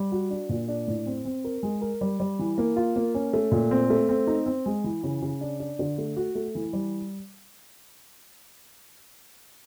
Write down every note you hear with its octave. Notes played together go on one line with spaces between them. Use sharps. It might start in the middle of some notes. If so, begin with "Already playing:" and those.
Already playing: G3
F#4
D4
A#2
D4
A2
C4
C4
A#4
G#3
A#4
G3
G3
E3
A#3
F4
A#3
C#4
A3
A#2
C4
A3
C4
D#4
C4
G#3
E3
C#3
C#3
D4
D4
D3
A3
F#4
A3
E3
G3